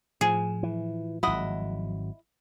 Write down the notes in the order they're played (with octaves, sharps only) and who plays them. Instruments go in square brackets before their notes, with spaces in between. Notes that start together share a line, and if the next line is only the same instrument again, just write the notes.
[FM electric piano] A2 F3 [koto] G#4
[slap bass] E3
[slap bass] G#1 F#3 [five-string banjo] E4 D#5 F#5